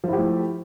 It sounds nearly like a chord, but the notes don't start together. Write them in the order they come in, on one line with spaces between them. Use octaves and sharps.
F3 E4 G4 A3